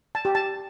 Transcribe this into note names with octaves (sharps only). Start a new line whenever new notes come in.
A5
G4
A5